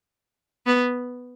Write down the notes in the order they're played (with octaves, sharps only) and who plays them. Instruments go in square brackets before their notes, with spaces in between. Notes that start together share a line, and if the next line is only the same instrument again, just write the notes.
[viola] B3